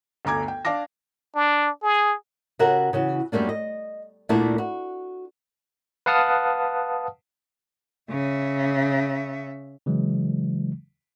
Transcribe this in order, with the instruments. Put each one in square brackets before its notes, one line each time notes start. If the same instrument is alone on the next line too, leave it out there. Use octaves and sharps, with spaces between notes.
[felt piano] G1 D2 A#5 D6 G#6
G5
D4 F5 A5 D6 A#6
[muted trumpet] D4
G#4
[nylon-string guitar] C#3 F#4 G4 A#4 E5 F#5
C#3 E3 F#4
F#2 G3 A3 A#3 D4
D#5
D2 A#2 D3 A3 E4 A4
F#4
[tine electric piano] B4 F5 F#5 A5 D#6 F6
[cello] C#3 E5
[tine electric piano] C#3 E3 F#3 G#3